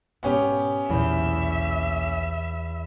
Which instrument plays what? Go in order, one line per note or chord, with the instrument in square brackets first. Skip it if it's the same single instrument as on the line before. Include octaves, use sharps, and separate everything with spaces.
[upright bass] G#2 B2 [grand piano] B3 C#4 G4
[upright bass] B1 A#2 [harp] E2 G6 [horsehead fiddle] E5